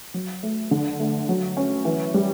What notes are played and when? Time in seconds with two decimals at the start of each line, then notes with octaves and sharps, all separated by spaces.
0.14 F#3
0.43 A3
0.71 D3
1.00 A3
1.29 F#3
1.57 C#4
1.85 E3
2.14 G3